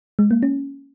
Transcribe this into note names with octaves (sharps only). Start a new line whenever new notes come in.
G#3
A#3
C#4